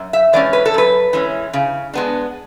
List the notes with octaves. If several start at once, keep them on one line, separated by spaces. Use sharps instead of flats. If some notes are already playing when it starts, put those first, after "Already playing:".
Already playing: F#2
E5
E3 G#3 C#4 D5
B4
A4
F#2 B4
E3 G#3 C#4
C#3
G#3 B3 D4